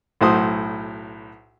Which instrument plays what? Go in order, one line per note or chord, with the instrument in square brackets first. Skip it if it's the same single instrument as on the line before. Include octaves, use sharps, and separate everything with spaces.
[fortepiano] B1 A2 F#4 C5 D#6